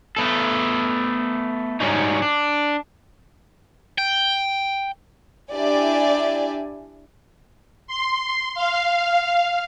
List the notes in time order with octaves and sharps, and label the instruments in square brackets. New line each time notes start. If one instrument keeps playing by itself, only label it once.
[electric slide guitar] A3 B3 A4
G#2 F#3 G3 C4 C#4 D#4
D4
[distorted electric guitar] G5
[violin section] D4 E4 G4 D5 E5 G#5
[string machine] C6
F5